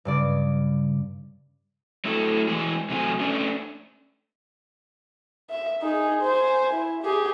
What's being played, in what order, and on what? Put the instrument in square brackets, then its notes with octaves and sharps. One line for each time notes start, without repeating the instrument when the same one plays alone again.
[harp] G2 C#3 D5
[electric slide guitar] F#3 A3 E4 A4
E3 G#3 G#4
C3 F#3 A3 F#4 G#5
A3 C#4 D4
[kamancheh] E5
D#4 G#4
C5 G#5
E4
G4 G#4